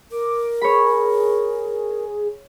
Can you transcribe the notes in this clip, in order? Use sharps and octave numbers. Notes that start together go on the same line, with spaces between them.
A#4 D6
G#4 C#5 B5